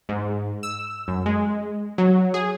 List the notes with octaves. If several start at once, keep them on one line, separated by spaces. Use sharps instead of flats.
G#2
E6
F#2
G#3
F#3
G#4